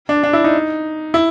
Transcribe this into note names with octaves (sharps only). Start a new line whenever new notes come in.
D4
D4
E4
D#4
E4